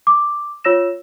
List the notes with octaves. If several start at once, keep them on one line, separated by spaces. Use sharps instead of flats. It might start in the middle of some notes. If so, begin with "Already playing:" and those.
D6
F4 C#5 E6 A#6 E7